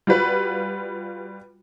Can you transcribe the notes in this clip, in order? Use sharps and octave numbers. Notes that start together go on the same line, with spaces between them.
G3 F4 F#4 B4